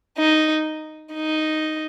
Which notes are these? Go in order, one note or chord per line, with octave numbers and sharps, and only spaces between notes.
D#4
D#4